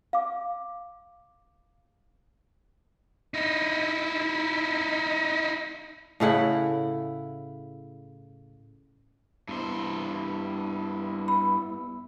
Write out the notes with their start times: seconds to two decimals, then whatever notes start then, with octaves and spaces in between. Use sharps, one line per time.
0.13 F5 D6
3.34 D#4 E4
6.20 A2 C#3 E4 F#5
9.48 G2 B3 E4 C5
11.28 B5